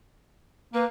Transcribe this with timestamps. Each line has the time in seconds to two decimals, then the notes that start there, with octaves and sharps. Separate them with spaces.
0.74 A#3 B4